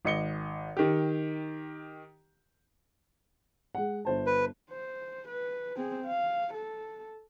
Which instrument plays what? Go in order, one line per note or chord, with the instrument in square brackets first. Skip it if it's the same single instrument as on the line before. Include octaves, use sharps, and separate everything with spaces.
[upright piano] G#1 D#5 C#7 G7
D#3 G4
G#3 F#5
G1 C5 A5
[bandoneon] B4
[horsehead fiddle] C5
B4
C4 G#4
F5
A4